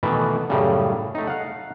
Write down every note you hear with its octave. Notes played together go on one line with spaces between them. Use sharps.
B2 D#3 E3 A3 B3
F#2 A2 C#3 G3
A3 D#4
F5 F#5